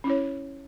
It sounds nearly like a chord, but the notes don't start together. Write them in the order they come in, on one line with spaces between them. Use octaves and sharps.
C#4 E4 C#5